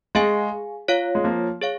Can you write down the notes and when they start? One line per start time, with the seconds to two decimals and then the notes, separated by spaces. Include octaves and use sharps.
0.15 G#3 G#4 F5 G#5
0.88 F4 C#5 F5
1.15 G#3
1.24 F3 A#3
1.61 G#4 C#5 F5